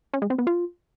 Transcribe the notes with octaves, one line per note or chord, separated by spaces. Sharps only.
C#4
G#3
C4
B3
F4